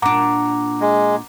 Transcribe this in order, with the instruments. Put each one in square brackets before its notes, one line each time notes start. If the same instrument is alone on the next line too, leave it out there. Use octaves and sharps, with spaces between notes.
[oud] A#2 D4 [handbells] F#5 A#5 D6
[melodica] G#3